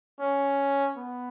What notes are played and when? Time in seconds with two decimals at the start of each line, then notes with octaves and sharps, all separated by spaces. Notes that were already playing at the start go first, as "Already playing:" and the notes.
0.20 C#4
0.97 B3